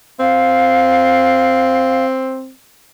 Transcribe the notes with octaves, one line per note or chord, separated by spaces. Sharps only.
C4 F5